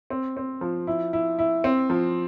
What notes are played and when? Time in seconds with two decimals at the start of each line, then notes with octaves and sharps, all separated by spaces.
0.10 C4
0.37 C4
0.61 F3
0.87 E4
1.13 E4
1.39 E4
1.64 C4
1.90 F3